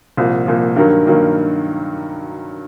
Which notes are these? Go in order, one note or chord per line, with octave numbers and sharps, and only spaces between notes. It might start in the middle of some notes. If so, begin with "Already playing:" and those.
C2 A#2 F3
C2 A#2 F3
G2 D#3 F#3 A#3
G2 D#3 F#3 A#3